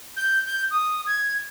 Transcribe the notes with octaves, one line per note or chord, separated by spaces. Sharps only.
G6
G6
D#6
G#6